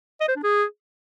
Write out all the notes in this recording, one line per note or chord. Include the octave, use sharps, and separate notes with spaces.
D#5
C5
D4
G#4